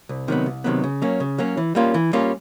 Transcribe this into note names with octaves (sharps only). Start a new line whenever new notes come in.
C2
C3 D#3 F#3 B3
C2
C3 D#3 F#3 B3
C#3
F#3 A#3 C#4
C#3
F#3 A#3 C#4
E3
G3 A#3 C#4 F4
E3
G3 A#3 C#4 F4